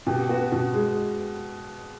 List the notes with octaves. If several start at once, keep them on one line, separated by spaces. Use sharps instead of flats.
B2 G4
B3 F#4
B2
G#3